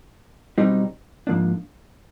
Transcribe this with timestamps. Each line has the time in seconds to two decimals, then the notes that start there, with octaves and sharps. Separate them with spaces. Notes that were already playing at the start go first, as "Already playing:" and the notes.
0.58 B1 B2 G3 C4 D#4
1.27 G#2 F3 A#3 D4